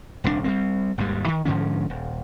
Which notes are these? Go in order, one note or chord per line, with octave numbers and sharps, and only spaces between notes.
D#1 C2 A#2 D4
G3 G#3 C4
G#1 D#2 G#2 G3
D#3
G#2 D3 F3 C#4
D#1